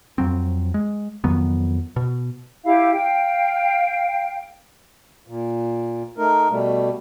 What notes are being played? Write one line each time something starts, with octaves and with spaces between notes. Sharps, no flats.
F2 F#3 C4
G#3
F2 D#3 F#3 B3
B2
E4 G4 F5
F5 G5
A#2
A3 D#4 A#4
B2 G3 A3